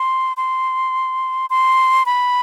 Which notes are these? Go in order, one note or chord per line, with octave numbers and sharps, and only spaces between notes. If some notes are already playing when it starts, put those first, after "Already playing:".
Already playing: C6
C6
C6
B5